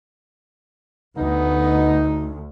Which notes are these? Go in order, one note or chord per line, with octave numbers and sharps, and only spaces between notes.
D2 B3 D#4